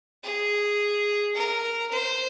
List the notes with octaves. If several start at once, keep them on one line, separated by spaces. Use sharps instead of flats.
G#4
A#4
C5